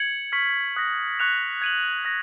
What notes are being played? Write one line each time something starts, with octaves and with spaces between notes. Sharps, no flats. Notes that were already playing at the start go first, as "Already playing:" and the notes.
Already playing: G#6 C#7 F#7
C#6 F6 B6 F#7
D#6 F#6 A#6
C#6 F#6 C#7 F7
G#6 D#7 F#7
F#6 A#6